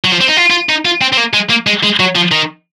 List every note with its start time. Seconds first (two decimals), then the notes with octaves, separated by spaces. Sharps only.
0.04 F#3
0.12 F3
0.21 C4
0.28 D#4
0.37 F4
0.50 F4
0.69 D#4
0.85 F4
1.02 C4
1.13 C4
1.17 A#3
1.34 G#3
1.50 A#3
1.67 G#3
1.83 G#3
2.00 F#3
2.16 F3
2.31 D#3